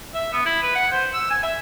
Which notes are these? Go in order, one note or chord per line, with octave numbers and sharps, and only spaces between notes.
E5
B3
E4
B4
F#5
C5
E6
G#5
E5